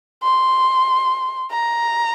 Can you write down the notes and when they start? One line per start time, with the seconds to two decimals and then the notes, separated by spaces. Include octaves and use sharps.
0.23 C6
1.51 A#5